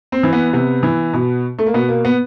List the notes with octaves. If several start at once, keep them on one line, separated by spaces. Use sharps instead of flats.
C4
E3
B3
C3 B3
E3
B2
A3
A#3
B2 B3
A#3
B3